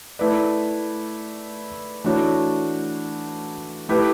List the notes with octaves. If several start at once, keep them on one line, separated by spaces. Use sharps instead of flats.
A3 E4 B4 D5
E3 A3 D4 F#4 C#5
A3 E4 G4 B4